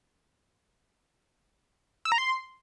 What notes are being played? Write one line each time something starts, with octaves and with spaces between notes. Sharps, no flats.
E6
A#5
C6